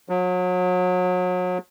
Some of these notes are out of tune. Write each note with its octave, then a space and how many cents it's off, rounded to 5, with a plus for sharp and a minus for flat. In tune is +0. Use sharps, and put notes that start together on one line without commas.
F#3 -35